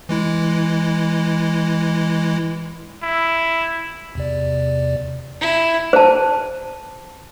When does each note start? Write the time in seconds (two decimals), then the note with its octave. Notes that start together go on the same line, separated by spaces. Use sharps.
0.09 E3 G#3 E4
3.03 E4
4.15 E2 C3 D5
5.41 E4
5.93 C5 A5